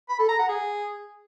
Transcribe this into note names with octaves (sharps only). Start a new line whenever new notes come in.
B5
A4
A#5
F#5
G#4